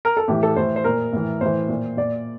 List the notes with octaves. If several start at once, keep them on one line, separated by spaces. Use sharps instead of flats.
A#4
A4
A2 E3 G4
A4
A2 E3 C5
C5
A#2 A#4
A2 E3
A2 E3 C5
A#2
A#2 D5